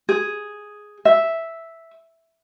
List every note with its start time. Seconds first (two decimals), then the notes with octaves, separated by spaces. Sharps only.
0.09 G#4
1.05 E5